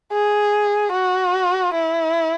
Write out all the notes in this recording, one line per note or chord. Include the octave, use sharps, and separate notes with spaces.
G#4
F#4
E4